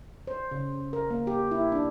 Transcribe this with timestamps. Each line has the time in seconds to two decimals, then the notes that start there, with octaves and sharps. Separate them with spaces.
0.27 C5
0.51 C#3
0.93 A#4
1.10 A#3
1.27 G4
1.51 E4
1.72 D4